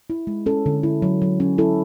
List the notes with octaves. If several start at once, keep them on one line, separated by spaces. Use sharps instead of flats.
E4
G#3
C#4 A4
D3
E4
F#3
F#3
C#4
E4 A4